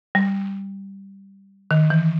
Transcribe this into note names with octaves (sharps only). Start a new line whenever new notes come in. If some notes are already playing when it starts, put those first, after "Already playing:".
G3
D#3
E3